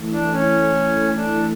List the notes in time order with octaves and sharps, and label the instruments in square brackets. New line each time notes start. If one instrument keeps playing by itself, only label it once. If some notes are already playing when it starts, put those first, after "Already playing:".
Already playing: [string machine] E3 A3 E4 A4
[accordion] D4
C#4
D4